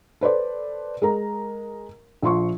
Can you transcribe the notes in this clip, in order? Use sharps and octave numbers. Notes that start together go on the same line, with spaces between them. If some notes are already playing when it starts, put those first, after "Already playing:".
A4 B4 C5 D5
G#3 A#4 A#5
A#1 F3 C6 C#6